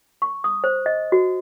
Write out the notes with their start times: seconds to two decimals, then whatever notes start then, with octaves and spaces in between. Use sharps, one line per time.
0.22 C#6
0.44 D#6
0.64 C5
0.86 D#5
1.12 F#4